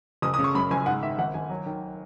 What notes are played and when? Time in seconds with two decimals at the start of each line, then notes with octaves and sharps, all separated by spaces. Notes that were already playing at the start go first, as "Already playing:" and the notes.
0.22 F#1 D#6
0.34 D#6
0.39 C#3
0.44 C#6
0.55 F#2 B5
0.71 F#1 G#5
0.86 G#2 F#5
1.02 D#3 E5
1.18 G#1 F#5
1.34 G#1 G#5
1.49 F#3
1.66 D#3